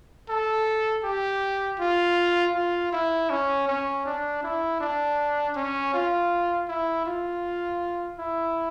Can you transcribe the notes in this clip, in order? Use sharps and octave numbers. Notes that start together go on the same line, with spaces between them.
A4
G4
F4
F4
E4
C#4
C#4
D4
E4
D4
C#4
F4
E4
F4
E4